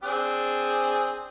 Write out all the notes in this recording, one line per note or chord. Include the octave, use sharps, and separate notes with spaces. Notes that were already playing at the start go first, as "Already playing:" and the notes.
C4 D4 G#4